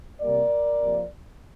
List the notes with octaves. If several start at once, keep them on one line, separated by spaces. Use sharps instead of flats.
C3 G3 A#3 A#4 D5
C3 F3 A#3